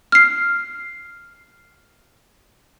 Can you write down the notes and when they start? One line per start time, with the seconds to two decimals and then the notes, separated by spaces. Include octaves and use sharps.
0.12 F6 C7